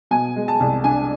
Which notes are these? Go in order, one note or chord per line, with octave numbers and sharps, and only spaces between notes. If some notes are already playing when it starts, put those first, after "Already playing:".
B2 G#5
G#3
A5
C2
D4 G#5